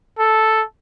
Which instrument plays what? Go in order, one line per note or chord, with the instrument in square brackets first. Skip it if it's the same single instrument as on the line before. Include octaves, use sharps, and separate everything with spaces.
[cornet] A4